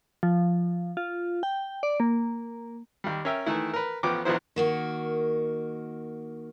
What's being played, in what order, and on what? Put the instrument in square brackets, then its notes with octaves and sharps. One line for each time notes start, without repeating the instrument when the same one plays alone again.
[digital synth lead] F3
F4
G5
D5
A#3
[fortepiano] D#2 G3
C#4 A#4 E5 G5
D#3 E3 A3 E4
A#4 B4
A1 F3 B3 G5 D6
A#1 E2 F3 B3 E4 C5
[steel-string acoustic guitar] D#3 A#3 F#4